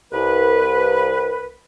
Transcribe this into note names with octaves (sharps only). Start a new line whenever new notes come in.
C2 B4